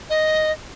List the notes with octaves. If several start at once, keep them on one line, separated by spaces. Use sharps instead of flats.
D#5